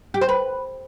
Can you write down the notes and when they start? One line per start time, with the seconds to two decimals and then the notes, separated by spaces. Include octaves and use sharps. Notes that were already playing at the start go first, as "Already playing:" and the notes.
0.14 G4
0.21 C5
0.29 B4